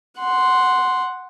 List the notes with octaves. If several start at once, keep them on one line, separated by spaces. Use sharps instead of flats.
F#5 C6